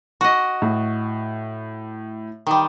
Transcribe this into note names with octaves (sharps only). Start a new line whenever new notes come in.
F#4 D#5
A2
D#3 G3